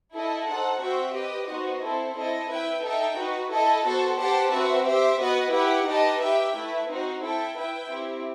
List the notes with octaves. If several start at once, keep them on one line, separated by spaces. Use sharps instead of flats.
E4 A4 D#5
D#4 A4 C5 F#5
C4 F#4 C5 E5 G5
G4 B4 D#5 G5
B3 D#4 F#4 C5 D#5
C4 E4 A4 C5
C4 E4 A4 D#5
E4 B4 E5 G5
D#4 A4 E5 G5
D#4 F#4 B4
E4 A4 D#5 A5
B3 F#4 A4 C5
G4 C5 F#5 A5
C4 F#4 B4 E5
G4 C5 E5
B3 F#4 B4 D#5
E4 G4 B4 F#5
D#4 G4 B4 D#5 A5
G4 B4 E5 G5
A3 E4 B4 E5
C4 D#4 F#4 C5
E4 A4 E5 G5
E4 B4 E5 G5
C4 E4 G4